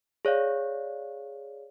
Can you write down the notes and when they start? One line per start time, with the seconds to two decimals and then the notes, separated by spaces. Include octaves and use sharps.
0.25 G#4 C#5 D5 F5